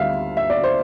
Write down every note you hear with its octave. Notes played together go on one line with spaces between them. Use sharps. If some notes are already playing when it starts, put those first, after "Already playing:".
Already playing: D2 D3 G3 E5 F5
E5
D5
C5